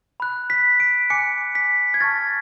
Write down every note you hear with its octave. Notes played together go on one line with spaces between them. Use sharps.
B5 F#6
B6
D7
G#5 D6 F#6 C#7
B6
G#6
A5 C#6 F6 A6